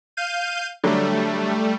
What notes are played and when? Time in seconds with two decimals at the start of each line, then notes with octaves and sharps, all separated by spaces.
0.17 F5 G6 D#7
0.84 D3 F#3 G3 A3